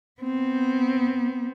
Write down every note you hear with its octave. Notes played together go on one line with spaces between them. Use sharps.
B3 C4